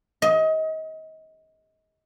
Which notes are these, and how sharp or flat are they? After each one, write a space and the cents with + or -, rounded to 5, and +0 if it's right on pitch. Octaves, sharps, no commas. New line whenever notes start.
D#5 +30